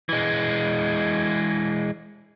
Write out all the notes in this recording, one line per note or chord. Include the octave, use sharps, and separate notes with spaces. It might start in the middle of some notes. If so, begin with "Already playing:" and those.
E3 G#3